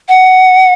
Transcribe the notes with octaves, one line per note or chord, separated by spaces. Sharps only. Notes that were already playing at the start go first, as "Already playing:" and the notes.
F#5